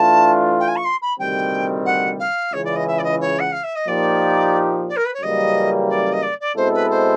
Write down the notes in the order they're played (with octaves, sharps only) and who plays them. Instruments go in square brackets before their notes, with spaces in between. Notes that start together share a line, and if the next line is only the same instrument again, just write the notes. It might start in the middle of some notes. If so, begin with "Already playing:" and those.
Already playing: [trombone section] E3 A3 D4 F4 [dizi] A5
[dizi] G5
G#5
C#6
C6
B5
[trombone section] D2 C3 D#3 G3 C4 [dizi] G5
[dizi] F#5
F5
[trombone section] C#2 C#3 E3 [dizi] C#5
[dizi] D5
D#5
E5
D5
D#5
C#5
F#5
F5
E5
D#5
[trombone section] A#2 F3 A#3 D#4 G4 [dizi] D5
[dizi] D5
A#4
B4
C#5
[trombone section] F#2 C#3 E3 G3 A#3 [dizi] D#5
[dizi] D5
D#5
D5
D5
[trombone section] B2 G#3 C4 E4 A4 [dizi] C5
[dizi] B4
C5